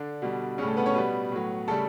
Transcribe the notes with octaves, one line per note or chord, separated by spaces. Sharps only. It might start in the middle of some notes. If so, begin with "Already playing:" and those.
Already playing: D3 D4
B2 G3
A2 C#3 G3 C#4
A3 A4
B3 B4
C#4 C#5
B2 G3 B3 B4
A2 F#3
C#3 G3 A3 A4